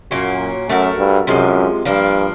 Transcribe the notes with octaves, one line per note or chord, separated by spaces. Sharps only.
F#2 A#2 F#3 A#3 C#4
F#2 A3 D4 F#4 A#4
G2
F#2 C3 F3 G#3
G2 F3 A#3 D4